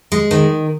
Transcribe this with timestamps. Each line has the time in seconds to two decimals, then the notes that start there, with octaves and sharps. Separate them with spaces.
0.12 G#3
0.31 D#3